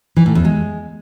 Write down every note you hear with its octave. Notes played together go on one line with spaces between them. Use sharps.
E3
A2
E2
G#3